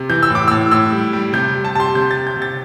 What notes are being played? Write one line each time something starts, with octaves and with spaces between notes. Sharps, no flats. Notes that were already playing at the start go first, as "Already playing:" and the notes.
Already playing: C3
E3 G6
E6
A2
D6
A2 E6
A2 E6
G3
G3
C3 G6
G3
A5
C3 A5 C6
C3 G6
A6
C3
G6
C3
A6